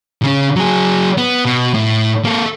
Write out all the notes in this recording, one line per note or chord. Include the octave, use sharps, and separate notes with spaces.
C#3 C#4
F#3 G#4
B3
B2
A2
A#3 A4